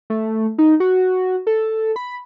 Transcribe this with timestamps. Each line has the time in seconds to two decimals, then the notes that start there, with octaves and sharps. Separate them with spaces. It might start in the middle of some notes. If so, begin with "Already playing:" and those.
0.10 A3
0.58 D#4
0.80 F#4
1.47 A4
1.96 B5